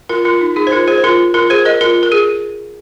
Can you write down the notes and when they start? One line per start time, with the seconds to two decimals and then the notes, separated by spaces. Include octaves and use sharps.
0.09 F4 A#4
0.25 F4 A#4
0.41 D#4
0.56 D#4 G#4
0.67 C5
0.72 F4 A#4
0.88 G#4 C5
0.98 C5
1.04 F4 A#4
1.34 F4 A#4
1.50 G#4 C5
1.65 A#4 D#5
1.81 F4 A#4
2.03 A#4
2.12 G#4